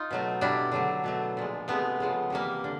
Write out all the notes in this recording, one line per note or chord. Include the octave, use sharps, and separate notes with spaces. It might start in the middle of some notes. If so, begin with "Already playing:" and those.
Already playing: D#4 F4
B2 F#3 A3
B2 G3 D4 E4
D3 F#3 A3
B2 F#3 A3
A#2 F3 G#3
C3 F3 G#3 A3 B3
C#3 F3 G#3
C3 E3 G3 A#3
D3